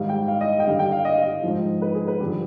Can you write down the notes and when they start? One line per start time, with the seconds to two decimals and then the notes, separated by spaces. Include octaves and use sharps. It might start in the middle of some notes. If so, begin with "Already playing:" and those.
Already playing: G#2 D#3 G3 F5
0.09 G5
0.28 F5
0.41 D#5
0.59 G5
0.67 G2 D3 G3 F5
0.79 G5
0.92 F5
1.05 D#5
1.13 F5
1.22 D#5
1.43 G#2 F3
1.82 B4
1.95 G#4
2.08 B4
2.20 G2 D3 F3 G4